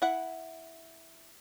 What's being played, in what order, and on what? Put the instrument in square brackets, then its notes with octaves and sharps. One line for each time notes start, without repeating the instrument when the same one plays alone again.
[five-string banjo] E4 F#5